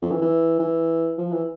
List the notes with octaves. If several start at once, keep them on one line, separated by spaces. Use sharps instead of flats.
F2
E3
E3
E3
F3
E3